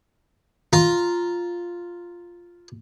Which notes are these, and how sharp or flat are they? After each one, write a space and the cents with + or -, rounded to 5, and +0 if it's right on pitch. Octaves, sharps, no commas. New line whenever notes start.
F4 +0 A#5 +0